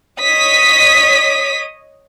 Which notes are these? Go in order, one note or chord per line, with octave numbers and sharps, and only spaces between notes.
C#5 D#5 D#6 B6